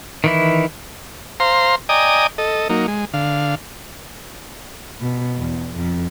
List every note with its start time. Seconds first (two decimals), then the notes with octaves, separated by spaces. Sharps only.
0.24 D#3 E3 E4
1.40 C5 F5 A#5 C6
1.89 D5 D#5 G5 G#5 A#5 D#6
2.38 A4 D#5
2.69 F#3 A#3 D#4
2.88 G#3
3.14 D3 F5
5.00 B2
5.38 E2
5.75 F2